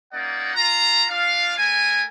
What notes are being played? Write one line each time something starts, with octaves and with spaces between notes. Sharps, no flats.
A#3 C#4 D#4 D5 F#5
F4 A#5
D4 F4 F5
A3 A#4 G#5